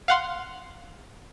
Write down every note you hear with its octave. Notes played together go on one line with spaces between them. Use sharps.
F5 F#5 C6